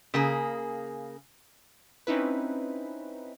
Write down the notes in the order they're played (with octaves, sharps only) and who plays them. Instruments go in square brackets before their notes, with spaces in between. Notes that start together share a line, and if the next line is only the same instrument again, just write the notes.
[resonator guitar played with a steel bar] C#3 A#3 G#4
[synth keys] C4 C#4 D#4 E4 B4